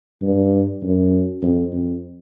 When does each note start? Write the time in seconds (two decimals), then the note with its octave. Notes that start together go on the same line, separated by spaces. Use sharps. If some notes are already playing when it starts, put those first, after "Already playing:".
0.22 G2
0.83 F#2
1.42 F2
1.73 F2